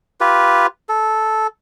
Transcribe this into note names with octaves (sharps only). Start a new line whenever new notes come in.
F4 G4 B4
A4